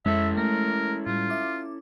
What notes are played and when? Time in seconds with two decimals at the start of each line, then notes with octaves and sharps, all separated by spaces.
0.06 F2 G#3 C#4 E4 A4 E5
0.37 A3 A#4
1.06 A2 G3 F4
1.30 E5 D6